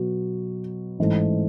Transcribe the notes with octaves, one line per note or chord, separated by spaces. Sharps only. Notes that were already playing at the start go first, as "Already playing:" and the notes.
Already playing: B2 F#3 B3 F#4
A1 G#2 E3 A3